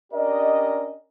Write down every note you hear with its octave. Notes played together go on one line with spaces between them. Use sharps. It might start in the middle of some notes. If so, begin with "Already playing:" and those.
C#4 D4 G4 A#4 D5 D#5